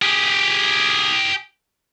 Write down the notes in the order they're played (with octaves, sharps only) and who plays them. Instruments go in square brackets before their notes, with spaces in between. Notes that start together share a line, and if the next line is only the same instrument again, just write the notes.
[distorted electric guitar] G4 G#4